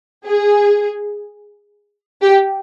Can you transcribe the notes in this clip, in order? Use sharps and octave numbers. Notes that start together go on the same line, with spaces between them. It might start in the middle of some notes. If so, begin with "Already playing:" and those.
G#4
G4